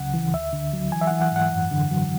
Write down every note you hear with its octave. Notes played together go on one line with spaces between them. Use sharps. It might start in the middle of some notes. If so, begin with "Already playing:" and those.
Already playing: C#2 C#3 F#3 F#5
E3
D2 E5
D3
F#3
E3 G#5
E5
E3 F#5
F#5
G#2 F#5
F#2
D3
F#3